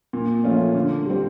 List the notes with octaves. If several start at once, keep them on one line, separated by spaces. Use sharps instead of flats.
A#2
F3 A3 C#4 F4
D3
G3 C4